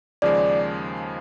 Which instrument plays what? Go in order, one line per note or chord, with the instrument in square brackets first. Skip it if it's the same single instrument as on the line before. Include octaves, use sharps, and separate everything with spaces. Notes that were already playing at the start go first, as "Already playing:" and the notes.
[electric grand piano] D#2 C#3 F3 G#3 [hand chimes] D5